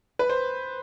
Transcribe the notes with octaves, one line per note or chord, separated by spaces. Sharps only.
B4
C5